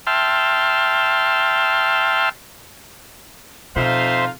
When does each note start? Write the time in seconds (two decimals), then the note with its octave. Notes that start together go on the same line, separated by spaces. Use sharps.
0.07 E5 G5 A5 C6 F6
3.76 F2 B2 D#4 F4 C5 E5 F5 C6